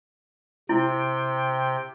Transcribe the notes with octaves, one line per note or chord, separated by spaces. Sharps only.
C3 E4 G5